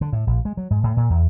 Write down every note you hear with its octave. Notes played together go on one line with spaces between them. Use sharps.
D3
A2
A#1
G#3
F#3
G#2
A2
A#2
E2